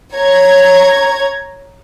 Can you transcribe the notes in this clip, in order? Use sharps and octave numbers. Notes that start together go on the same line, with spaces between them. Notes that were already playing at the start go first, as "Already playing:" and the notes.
C#5 A#5 G#6